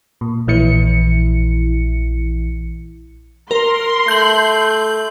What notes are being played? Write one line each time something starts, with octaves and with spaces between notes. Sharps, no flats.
A#2
A#1 E3 E4 C#7
A#4 C6
A3 G6 F#7